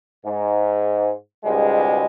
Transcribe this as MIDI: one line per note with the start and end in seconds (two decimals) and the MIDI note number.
0.25 1.10 44
1.44 2.06 37
1.44 2.06 44
1.44 2.06 47
1.44 2.06 55
1.44 2.06 56